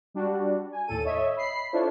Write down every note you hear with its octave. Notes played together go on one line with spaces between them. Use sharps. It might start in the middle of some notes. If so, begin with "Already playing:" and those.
G3 D4 F#4
G#5
D#2 A2 A4 D#7
C#5 D#5 E5
B5 C7
D4 E4 F4 A4 C5 C#5